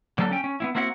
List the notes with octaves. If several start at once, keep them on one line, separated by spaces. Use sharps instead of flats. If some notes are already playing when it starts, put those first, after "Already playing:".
D3 F#3 A#3 G4 A4
C#4 G5
C#4
B3 C4 E4
A#3 C4 E4 F#4 E5 F#5